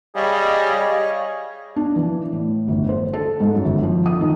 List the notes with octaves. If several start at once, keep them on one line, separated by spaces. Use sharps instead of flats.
G3 G#4 C#5 D#5 F5
D4
E3
A2
G1
C5
A4
G#2
F#2
G1
F3
D#6
D#3